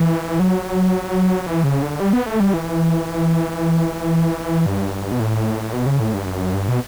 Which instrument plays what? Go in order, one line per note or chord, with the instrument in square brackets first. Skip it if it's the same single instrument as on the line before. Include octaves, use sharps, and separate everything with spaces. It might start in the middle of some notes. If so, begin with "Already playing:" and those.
Already playing: [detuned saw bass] E3
F#3
E3
C#3
D3
G3
B3
A3
G3
E3
G2
B2
A2
B2
C#3
A2
G2
F#2
G2
B2